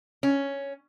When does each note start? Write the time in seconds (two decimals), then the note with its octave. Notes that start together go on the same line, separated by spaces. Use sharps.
0.23 C#4